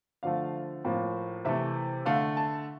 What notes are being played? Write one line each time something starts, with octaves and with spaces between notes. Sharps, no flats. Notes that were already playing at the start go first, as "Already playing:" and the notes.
D3 F3 A3 F5
A2 F3 A#3
C3 E3 A3 E5
D3 A3 F5
A5